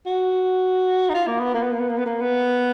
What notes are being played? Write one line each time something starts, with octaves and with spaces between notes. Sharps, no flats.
F#4
D#4
F4
A#3
B3
A#3
B3
A#3
B3
A#3
B3
A#3
B3